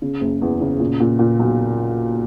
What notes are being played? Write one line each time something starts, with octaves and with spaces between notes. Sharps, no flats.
C#3
F#1
E2
C#3
A#2
A#2
A#2
B1